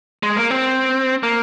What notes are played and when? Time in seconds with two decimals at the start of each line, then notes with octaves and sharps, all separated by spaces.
0.23 G#3
0.37 A#3
0.51 C4
1.23 A#3